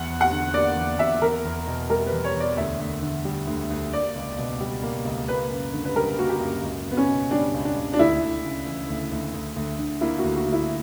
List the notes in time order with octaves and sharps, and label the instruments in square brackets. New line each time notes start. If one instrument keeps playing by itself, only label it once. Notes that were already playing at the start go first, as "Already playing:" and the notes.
Already playing: [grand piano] E2 [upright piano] F#5
[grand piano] E2
[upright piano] F#5
[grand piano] D3
[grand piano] A#3 [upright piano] D5
[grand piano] E2
[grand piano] E2 [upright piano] E5
[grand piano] E2 [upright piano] A#4
[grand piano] E2
B2
[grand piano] G3 [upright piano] A#4
[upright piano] B4
[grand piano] E2
[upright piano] C#5
[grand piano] E2
[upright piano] D5
[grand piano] D2 [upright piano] E5
[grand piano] D2
D3
G3
D2
D2
[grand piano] A#3 [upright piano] D5
[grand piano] C#2
B2
G3
A#3
C#2
[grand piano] A#3 [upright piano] B4
[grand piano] F#2
D3
[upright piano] B4
[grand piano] G3 [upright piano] A#4
[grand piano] A#3 [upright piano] F#4
[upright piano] G4
[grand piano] F#2
C#2
C#2
[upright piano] B3
C#4
[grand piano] B2
[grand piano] G3 [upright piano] D4
[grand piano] C#2
[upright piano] D4
[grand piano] C#2
[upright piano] D4
[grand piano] D2 [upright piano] E4
[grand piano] D2
C#3
E3
D2
D2
D2
D2
D3
[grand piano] A#3 [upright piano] E4
[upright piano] F#4
[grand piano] D2
[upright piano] F#4
[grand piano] D2
[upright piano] E4